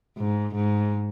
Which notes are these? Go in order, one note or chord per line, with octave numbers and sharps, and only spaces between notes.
G#2
G#2